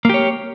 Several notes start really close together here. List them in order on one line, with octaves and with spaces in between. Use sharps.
A#3 G4 C#5